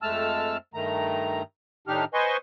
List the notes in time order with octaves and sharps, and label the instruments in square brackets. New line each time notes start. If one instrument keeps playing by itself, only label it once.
[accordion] F2 G#3 A3 A5 E6 F6
G2 D#3 A3 A#5
A2 D#3 D4 D#4 G4 F6
B4 C5 D#5 G#5 C6 C#6